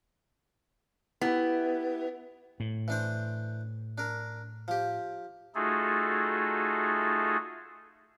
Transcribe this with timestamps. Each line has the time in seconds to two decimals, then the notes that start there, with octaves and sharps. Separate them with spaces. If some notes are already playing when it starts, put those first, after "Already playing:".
1.21 B3 E4 G4
2.60 A2
2.88 E3 D4 C5
3.98 D4 A#4
4.68 F3 G4
5.55 A3 D#4 F4 F#4 G#4 A4